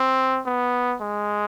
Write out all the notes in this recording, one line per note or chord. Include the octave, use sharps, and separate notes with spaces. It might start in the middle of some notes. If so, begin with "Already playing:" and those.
Already playing: C4
B3
G#3